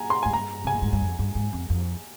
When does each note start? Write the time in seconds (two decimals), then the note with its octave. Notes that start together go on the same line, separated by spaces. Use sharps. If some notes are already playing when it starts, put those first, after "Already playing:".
Already playing: G#5 A#5
0.10 C6
0.23 G#2 G#5
0.33 G2 A#5
0.64 C3 G#5
0.73 A#2
0.82 G#2
0.93 G2
1.01 F2
1.19 G2
1.35 G#2
1.53 F2
1.70 F2